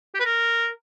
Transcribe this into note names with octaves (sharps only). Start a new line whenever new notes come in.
G4
B4
A#4